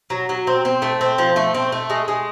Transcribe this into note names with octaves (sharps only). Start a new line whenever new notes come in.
F#3
F#3
C4
C4
A3
C4
F3
A3
C4
A3
G#3
G#3